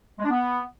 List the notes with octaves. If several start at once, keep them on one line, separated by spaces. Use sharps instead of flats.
G#3
D4
B3